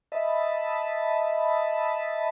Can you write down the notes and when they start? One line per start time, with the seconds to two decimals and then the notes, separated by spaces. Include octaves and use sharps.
0.12 D#5 E5 A5 B5